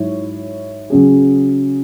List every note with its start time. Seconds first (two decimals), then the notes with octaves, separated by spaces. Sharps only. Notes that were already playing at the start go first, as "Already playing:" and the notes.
Already playing: G#2 F#3 E4 C#5
0.90 C#3 F#3 C#4 G#4